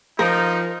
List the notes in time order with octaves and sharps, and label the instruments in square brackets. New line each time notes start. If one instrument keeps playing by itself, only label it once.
[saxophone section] F3 [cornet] D#4 [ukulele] A#4